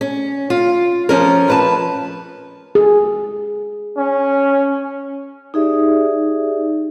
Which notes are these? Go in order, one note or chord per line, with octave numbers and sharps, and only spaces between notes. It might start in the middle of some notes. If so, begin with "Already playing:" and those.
C#4
F4
F3 C#4 A#4
F2 B4 A5
G#4
C#4
D#4 G4 G#4 D5 E5